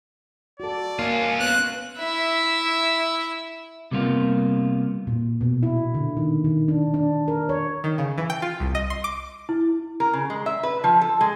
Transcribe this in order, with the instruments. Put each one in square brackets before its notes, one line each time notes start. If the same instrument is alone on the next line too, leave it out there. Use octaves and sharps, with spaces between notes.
[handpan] F#4 A4 [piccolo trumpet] D5
[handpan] A#3 [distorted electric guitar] C#4 F4
[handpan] B3 [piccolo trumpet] F#6
[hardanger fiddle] E4 E5
[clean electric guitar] C3 G3 A#3 B3 F4
[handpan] A#2
B2
E4
D3
D#3
D#3
D4
D4
A#4
C#5
[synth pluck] D#3
C#3
E3
G5
F4
C2
D#5
C6
D6
[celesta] E4
[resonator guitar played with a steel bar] A#4
C#3
G#3
E5
B4
F3
A4
G#3